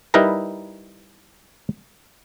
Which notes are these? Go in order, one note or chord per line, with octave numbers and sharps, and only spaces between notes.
G3 D#4 E4 A#4 B4 A#5